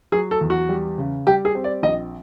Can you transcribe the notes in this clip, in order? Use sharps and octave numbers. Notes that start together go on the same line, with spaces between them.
F#3 G#4
A4
E2
F#4
G3
C#3
G3 G4
G#4
C4
D5
A#1 D#5